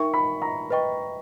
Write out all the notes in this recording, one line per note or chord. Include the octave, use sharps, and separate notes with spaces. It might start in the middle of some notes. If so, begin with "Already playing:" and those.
Already playing: D#4 A#4 E5 G5 C#6
B5
A#5
B4 D#5 G5 C#6